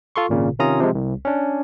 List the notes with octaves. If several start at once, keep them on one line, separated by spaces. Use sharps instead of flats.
F4 A4 C6 C#6
G#1 A#2 C#3
C3 D#3 C#4 F4 A#5 D#6
C3 F3 G#3
C2
C#4 D4